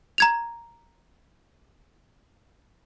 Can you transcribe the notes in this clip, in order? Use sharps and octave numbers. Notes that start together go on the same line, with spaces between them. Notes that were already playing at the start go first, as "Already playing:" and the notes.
A#5 G#6 F7